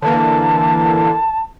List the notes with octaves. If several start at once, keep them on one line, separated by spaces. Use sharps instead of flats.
D3 E3 A#3 A5